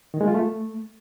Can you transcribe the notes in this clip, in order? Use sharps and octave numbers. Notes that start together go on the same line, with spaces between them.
D#3
G#3
F4
A3